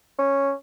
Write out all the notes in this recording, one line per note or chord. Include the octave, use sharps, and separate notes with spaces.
C#4